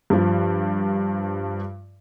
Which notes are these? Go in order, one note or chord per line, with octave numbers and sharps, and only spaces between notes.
G2 F3